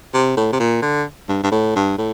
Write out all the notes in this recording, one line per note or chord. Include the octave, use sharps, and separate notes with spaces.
C3
A2
C3
A#2
D3
G2
G2
A2
G2
A2